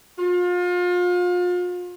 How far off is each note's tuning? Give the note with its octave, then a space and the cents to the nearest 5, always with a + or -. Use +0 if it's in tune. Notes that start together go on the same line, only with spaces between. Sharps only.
F4 +35